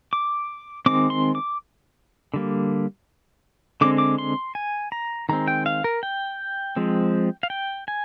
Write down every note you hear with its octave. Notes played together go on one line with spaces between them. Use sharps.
D6
D#3 G#3 C4 D6
C6
D6
D3 G3 A#3
D3 G#3 C4 D6
D6
C6
G#5
A#5
D#3 G#3 C4 A#5
G5
F5
A#4
G5
F3 G#3 C4
F5
G5
G#5